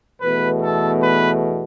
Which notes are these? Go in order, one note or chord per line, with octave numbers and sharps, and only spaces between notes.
E2 B2 A3 B4
A4
B4